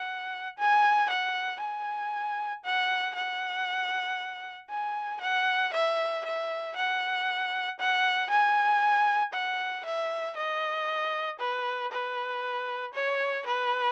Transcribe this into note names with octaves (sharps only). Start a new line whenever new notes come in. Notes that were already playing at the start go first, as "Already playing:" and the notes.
Already playing: F#5
G#5
F#5
G#5
F#5
F#5
G#5
F#5
E5
E5
F#5
F#5
G#5
F#5
E5
D#5
B4
B4
C#5
B4